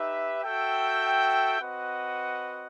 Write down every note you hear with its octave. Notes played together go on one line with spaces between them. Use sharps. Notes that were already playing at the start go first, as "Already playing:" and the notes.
Already playing: D#4 G4 B4 E5
F#4 A4 E5 G5
C4 F#4 B4 D#5 F#5